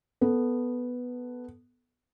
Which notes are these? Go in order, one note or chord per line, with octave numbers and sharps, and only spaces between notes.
B3 A4